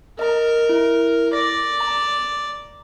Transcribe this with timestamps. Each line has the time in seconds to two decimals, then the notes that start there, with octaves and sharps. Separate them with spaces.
0.19 A#4 D#5 A#5
0.69 E4
1.33 D5 A#6
1.80 A#5